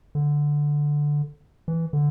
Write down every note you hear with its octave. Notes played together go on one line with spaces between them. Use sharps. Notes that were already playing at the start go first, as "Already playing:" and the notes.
D3
E3
D3